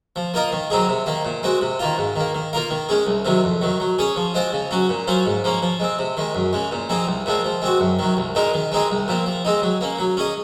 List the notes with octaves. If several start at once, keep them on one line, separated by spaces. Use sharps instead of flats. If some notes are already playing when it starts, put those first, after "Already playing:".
F3
A#3 F4 A#4 D#5
D#3
F#3 C4 D#4 G#4
C3
D#3 A#3
A#2
G#3 C4 F#4
C3
D#3 A#3 F4
G#2
D#3 A#3
D#3
A#3 F4 A#4 F5
D#3
G#3 C#4 G#4
C2
C3 D#3 F#3
F2
D#3 F#3
F#3
C#4 G#4 C#5
F3
G#3 C4 F4 C5
C#3
F#3 C#4 F#4
A#2
F#3 C#4 F4 C5
G#2
F3 A#3 C#4
F3
G#3 C4
C3
D#3 G#3
F#2
C#3 G#3
A#2
F3 C4 D#4 G#4
C2
A#2 F3 G#3 C4
F3
G#3 C4 F#4
F#2
D#3 F#3
C2
A#2 G#3 D#4 A#4
D#3
G#3 C4 D#4 G#4
C2
A#2 F3 C4
F3
G#3 C4 D#4
F#3
A#3 C#4
F#3
C#4 G#4 D#5